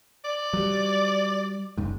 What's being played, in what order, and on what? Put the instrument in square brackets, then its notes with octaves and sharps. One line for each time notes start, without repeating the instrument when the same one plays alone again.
[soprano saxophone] D5
[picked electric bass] F#3 G3
F#1 C#2 G#2